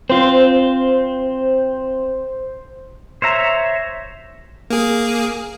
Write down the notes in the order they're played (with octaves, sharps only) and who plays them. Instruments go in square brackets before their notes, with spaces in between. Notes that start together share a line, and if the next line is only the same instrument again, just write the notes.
[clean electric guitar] C4 F4 [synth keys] C5
[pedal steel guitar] C5 C#5 E5 A#5
[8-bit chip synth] A#3 G#4